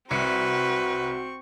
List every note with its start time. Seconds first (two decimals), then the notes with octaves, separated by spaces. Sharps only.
0.11 C2 C4 F#4 B4 C#6 C#7